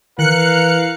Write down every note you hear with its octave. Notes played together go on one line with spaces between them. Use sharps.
D#3 E3 A#4 F5 F#6 C#7